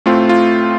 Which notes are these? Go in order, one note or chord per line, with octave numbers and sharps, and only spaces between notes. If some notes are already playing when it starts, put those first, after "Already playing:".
A2 A3 C4 F4
F4